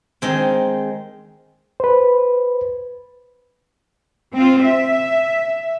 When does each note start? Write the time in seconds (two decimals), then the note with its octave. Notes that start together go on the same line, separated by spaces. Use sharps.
0.22 D#3 G#3 C4
1.80 B4 C5
4.34 C4 F4
4.64 E5